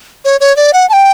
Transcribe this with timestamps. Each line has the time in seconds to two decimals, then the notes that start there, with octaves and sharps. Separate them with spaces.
0.25 C#5
0.41 C#5
0.57 D5
0.74 F#5
0.89 A5
0.93 G5